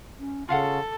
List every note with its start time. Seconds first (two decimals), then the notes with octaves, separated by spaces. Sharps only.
0.19 C#4
0.49 C#3 F4 A4 F5 F#5